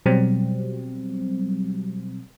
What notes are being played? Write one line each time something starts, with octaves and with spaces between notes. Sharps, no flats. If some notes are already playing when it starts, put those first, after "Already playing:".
B2 F#3 G3 C4